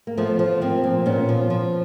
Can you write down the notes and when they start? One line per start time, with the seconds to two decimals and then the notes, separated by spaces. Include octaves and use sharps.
0.07 A#3
0.17 F3 A3 B3
0.39 F3
0.61 F3 A#3 C4
0.84 A#2
1.06 A#2 B3 C#4
1.29 F3
1.50 F3